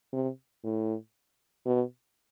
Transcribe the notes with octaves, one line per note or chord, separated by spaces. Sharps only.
C3
A2
B2